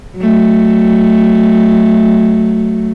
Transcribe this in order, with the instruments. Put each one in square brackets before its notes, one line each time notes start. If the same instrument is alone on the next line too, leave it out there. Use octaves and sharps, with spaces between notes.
[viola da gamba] F#3 A3